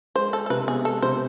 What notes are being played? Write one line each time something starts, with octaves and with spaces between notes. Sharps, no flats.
G#3 C5
G#3 A4
A4
C3 B4
B3 G#4
G#3 A4
C3 C5